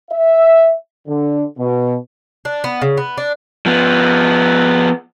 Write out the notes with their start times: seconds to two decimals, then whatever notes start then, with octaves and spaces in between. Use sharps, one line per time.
0.11 E5
1.07 D3
1.58 B2
2.45 D4
2.64 B3
2.82 C#3
2.97 B3
3.18 D4
3.66 F3 B3